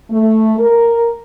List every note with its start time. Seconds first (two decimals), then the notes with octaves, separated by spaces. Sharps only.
0.10 A3
0.58 A#4